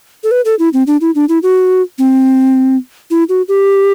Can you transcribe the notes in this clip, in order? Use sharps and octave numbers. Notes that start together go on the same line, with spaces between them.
A4
B4
A4
E4
C4
D4
E4
D4
E4
F#4
C4
E4
F#4
G4